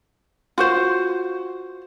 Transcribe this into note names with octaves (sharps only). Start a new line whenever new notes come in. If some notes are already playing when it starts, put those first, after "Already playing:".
F4 F#4 C5